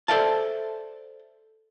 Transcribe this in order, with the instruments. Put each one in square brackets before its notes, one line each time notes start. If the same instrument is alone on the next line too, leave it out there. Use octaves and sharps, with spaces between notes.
[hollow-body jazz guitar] A4 C5 D5 E5 F5 A5